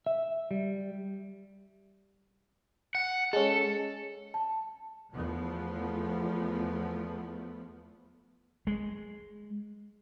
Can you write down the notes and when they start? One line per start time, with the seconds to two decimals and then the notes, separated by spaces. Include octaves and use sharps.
0.06 E5
0.51 G3
2.95 F#5
3.33 G#3 C#4 A4
4.34 A5
5.13 E2 F3 A3 B3
8.67 G#3